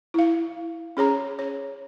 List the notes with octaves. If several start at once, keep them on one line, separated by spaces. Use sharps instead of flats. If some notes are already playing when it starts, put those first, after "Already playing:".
E4 F5
C#4 G#4 C#5 A#5
C#5